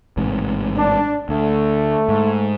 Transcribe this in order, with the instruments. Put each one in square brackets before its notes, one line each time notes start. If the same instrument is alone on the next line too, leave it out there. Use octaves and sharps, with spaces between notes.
[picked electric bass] A1 G#2 C3
[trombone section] D4
[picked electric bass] D2 [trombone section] A3
[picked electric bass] G#2